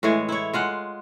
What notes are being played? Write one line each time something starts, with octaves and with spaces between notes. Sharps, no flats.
A2 E3 G#3 C#5
E4 C#5
G#3 F4 F#5